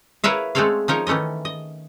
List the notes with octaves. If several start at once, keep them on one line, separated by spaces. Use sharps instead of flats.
E4 A#4 B4 C#5 E5 F5
G#3 A3 C4 A4 C#5 F5
F3 D#4 A#4 C#5
D#3 E3 A3 C#4 D#5
D#5